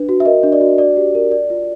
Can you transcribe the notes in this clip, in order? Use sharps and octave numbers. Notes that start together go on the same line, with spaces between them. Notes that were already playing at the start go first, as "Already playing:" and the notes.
Already playing: D4 B4
F#4
E5
A#4 D#5
D4
D5
F#4
D5
G4
A#4
D5
F4